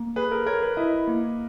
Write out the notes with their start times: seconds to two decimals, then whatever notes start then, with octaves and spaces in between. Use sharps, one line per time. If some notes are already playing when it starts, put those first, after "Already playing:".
Already playing: A#3
0.16 G#4 B4
0.31 A#4
0.46 A#4 C#5
0.62 B4
0.77 E4 D#5
1.07 A#3